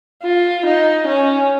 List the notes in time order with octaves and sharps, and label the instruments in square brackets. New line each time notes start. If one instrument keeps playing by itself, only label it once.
[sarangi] F4
D#4
C#4